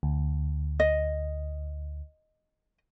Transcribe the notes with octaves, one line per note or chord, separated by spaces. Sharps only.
D2
D#5